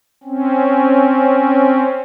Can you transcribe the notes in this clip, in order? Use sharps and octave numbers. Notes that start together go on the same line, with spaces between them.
C4 C#4